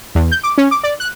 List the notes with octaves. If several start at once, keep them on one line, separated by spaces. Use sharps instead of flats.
E2
G6
D6
C#4
D6
D5
F#6